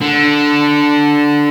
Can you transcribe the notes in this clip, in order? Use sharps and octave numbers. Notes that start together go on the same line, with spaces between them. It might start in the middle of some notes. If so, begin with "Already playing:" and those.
D3